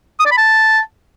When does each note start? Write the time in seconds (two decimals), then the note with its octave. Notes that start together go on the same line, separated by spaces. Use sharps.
0.20 D#6
0.25 D5
0.31 B5
0.37 A5